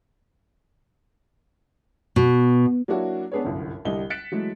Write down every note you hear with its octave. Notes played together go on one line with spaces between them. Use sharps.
B2
F#3 A#3 D4 E4 F#4 C#5
B3 D4 G#4 B4 C#5
G1 C2 F#2
C2 D3 G3 D#5 G7
F#6 A6 B6 C#7 D7 E7
E3 F#3 G#3 A3